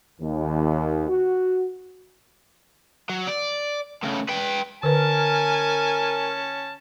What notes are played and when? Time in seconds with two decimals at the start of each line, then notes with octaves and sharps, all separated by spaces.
0.21 D#2
1.09 F#4
3.09 F#3
3.27 D5
4.03 A2 C#3
4.29 B4 G5
4.83 D3 C#4 A#4 B4 G#5 A5